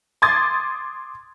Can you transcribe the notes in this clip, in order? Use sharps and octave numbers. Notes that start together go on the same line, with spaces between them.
C6 D6 D#6 G#6 A6